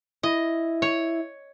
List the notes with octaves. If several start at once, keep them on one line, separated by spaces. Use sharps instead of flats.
E4 D#5
C#5